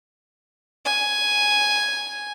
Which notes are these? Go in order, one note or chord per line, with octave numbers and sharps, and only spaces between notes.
G#5